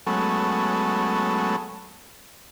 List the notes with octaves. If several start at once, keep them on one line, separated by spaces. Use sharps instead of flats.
F#3 G#3 A3 B3 C#4 A4